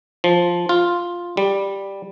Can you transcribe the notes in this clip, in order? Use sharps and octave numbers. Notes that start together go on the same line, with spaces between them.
F3
F4
G3